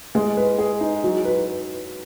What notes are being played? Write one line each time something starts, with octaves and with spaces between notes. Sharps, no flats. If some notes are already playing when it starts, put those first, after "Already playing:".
G#3
B4
G#4
D#4
F#3
B4